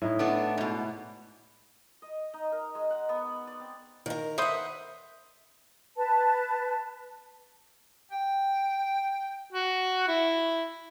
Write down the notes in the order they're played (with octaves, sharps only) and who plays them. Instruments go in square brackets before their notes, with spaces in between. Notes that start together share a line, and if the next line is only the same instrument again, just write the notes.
[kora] A2 D#4 E4
[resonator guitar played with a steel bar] A3 B3 D4
G#2 B2
[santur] D#5
D#4
A#4
G#3
F#5
B3
D5
C4
[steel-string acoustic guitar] D#3 A#4
[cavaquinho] B4 C5 D#6 [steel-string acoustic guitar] E5 F#5
[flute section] B4 A5
[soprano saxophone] G5
F#4
E4